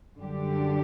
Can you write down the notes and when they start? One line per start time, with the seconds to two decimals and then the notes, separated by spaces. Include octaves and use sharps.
0.17 F#2 D3 G3 D4 G4